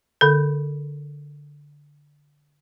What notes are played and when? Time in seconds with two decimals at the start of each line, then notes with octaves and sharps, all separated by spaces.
0.21 D3 A4